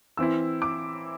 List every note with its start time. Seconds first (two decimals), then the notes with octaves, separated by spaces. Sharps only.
0.17 E3 C4 E4 E6
0.62 D6